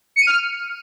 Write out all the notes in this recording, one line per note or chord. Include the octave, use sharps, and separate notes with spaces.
C#7
D#7
F6